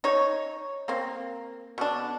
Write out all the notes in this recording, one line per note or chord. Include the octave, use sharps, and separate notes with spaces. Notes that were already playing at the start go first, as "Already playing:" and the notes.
D#4 C#5
A#3 C4
B2 D4